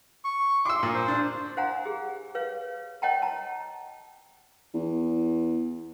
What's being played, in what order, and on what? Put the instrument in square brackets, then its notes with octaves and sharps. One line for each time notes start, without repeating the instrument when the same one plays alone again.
[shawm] C#6
[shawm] C6 [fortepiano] D6 E6
[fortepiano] A#2
[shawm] C5
[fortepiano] D4
[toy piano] C5 F5 F#5 G#5 A#5
G4 G#4
B4 C#5 F5
C#5 D#5 F#5 G5 A5 A#5
A5 A#5
[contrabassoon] E2